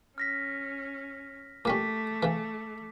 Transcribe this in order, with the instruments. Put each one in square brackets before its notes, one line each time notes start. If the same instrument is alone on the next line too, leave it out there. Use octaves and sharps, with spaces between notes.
[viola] C#4 [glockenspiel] F6 A#6 B6
[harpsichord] A#2 G3 C#4 [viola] A3 [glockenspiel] D6 B6
[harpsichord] C#3 E3